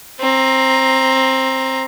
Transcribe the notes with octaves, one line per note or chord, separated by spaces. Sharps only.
C4 A#5